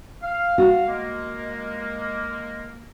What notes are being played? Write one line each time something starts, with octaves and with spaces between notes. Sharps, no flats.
F5
F#4
G#3 A#3